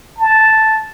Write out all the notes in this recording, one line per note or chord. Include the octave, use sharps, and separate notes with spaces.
A5